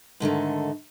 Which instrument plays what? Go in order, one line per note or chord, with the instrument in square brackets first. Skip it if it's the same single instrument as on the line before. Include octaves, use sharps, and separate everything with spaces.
[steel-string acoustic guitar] G#2 D3 D#3 A3